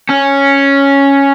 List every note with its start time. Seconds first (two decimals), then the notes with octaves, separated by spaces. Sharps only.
0.09 C#4